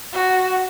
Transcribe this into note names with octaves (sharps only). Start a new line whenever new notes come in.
F#4